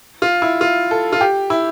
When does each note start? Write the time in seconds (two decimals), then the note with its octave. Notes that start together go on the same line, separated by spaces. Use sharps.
0.22 F4
0.42 E4
0.61 F4
0.91 A4
1.12 F4
1.21 G4
1.50 E4